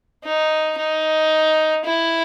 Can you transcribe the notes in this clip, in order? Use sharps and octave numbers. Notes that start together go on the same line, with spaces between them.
D#4
D#4
E4